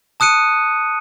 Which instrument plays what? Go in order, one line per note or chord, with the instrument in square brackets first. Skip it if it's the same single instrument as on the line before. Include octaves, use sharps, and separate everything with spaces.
[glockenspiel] A5 D#6 F#6 C#7 D#7